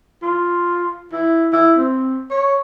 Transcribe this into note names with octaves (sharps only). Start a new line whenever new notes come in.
F4
E4
E4
C4
C#5